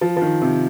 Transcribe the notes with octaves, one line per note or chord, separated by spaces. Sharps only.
F3
F3
D#3
C3